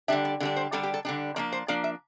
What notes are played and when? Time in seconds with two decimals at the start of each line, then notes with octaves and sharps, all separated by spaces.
0.08 D3 G3 D4 E5
0.25 D5
0.40 D3 G3 D4
0.56 C5
0.72 D3 G3 D4 A4
0.83 G4
0.94 A4
1.05 D3 G3 D4
1.36 F3 A#3 D4 D5
1.53 C5
1.68 F3 A#3 D4 D5
1.84 E5